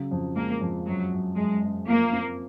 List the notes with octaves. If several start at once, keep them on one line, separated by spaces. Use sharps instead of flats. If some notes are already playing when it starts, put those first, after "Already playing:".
Already playing: C#3 F#3
F2
G#3 A#3
F2
F#2 F#3
F#2
F#2 G#3
F#2
F3 A#3
C4